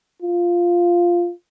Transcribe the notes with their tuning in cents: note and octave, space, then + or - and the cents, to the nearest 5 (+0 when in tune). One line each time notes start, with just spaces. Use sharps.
F4 -5